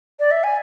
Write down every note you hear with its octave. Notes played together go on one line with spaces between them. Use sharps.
D5
E5
G#5